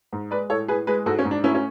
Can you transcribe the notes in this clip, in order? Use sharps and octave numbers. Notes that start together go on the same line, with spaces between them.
G#2
G#3 B4 D5
A2 A4 C#5
A2 G#4 B4
G#3 G#4 B4
G#2 F#4 A4
C#4
G#2
D4
A3 C#4 E4
C#4